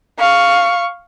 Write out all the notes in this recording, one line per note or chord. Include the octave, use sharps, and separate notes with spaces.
F5 C#6